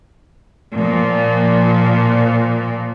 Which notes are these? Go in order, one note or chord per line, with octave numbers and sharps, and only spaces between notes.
A#2 F3